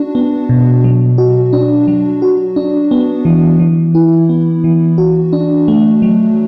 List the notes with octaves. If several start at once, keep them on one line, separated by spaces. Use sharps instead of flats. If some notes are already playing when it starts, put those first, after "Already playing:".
Already playing: D4 F#4
B3
B2
F#3
F#4
D4
F#3
F#4
D4
B3
E3
E3
E4
B3
E3
F#4
D4
A3
F#3